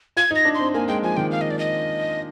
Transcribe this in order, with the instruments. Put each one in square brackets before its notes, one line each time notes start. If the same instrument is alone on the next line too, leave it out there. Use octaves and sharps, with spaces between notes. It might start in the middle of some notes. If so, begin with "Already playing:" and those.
[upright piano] F4 [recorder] G#6
[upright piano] D#4
[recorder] A#6
[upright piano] D4
[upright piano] C4 [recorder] C6
[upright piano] A#3 [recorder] G#5
[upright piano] G#3 [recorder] G5
[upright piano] F3 [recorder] G#5
[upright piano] D#3 [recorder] G5
[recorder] F5
D#5
D5
D#5